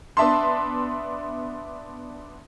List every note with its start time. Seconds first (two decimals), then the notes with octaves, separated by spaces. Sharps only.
0.17 B3 D4 E5 A5 C6